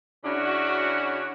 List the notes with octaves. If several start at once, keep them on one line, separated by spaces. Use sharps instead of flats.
C#3 C#4 D4 E4 F#4